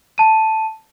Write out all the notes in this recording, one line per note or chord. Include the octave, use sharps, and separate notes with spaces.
A5 D#7